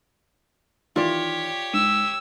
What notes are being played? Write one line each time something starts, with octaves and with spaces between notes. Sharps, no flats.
D#3 E3 F4 G4 C#5 D5
G#2 E6